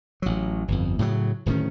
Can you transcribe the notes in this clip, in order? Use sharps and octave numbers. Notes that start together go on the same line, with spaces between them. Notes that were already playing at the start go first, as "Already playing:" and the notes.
A1 F#3
G1 F2
A2 C#3 E3 F#3
D1 A2 D#3 C#4